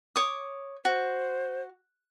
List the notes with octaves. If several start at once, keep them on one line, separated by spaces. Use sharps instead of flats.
C#5 D6 D#6
F#4 C5